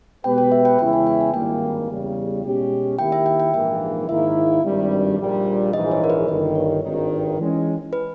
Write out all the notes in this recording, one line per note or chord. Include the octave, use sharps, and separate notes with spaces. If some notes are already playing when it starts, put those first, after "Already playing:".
B2 G#3 B3 G4 B4 G5
G5
E5
G5
E2 C#3 G#3 C#4 E4 G5
G#5
G5
G#5
G#1 G2 D#3 G3 A#3 G5
E2 C#3 G3
B2 G#3 C#4 G4
D#3 A#3 E4 G4 G5
E5
G5
G5
A#1 G#2 E3 A#3 E5
G#2 D#3 A#3 E4 E5
G#1 G2 D#3 G3
A#1 A#2 G3
A#1 G#2 E3 D#5
C#5
A#4
B4
G1 G2 D#3 D#5
C#5
G#1 G2 D#3
E3 G#3 C#4
B4